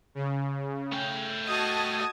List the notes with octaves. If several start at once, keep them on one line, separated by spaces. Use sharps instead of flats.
C#3
A3 G5
F#4 D#5 A5 D#6 G#6